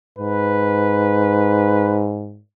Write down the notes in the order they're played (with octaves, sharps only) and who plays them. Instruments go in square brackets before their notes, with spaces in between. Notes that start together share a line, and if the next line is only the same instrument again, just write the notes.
[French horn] G#2 [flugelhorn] B4